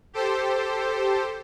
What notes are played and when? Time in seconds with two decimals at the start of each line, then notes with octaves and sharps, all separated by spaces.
0.13 G4 A4 C5